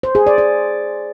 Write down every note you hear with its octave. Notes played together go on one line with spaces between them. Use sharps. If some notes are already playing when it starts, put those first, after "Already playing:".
C5
G#4
D5
D5